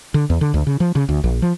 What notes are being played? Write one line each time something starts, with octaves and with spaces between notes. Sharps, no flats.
D3
E2
D3
D2
C#3
F3
C#3
D2
A#1
F3